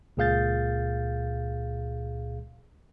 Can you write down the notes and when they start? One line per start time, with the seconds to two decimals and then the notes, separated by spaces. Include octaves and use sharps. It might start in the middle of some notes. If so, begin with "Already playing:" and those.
0.17 C#2 A#2 G#4 F5 G6 A6